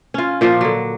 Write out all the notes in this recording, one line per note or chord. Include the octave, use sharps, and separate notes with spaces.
C#4 F4
A#2 F3 D4 F4
D3 F#3